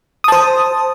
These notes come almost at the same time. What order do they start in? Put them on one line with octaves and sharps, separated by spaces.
D#6 A5 C5